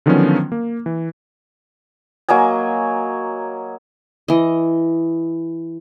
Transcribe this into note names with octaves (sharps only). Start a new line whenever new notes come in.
D3 D#3 F3 F#3 B3 C#4
A#3
E3
F#3 A#3 D#5 G#5
E3 D#5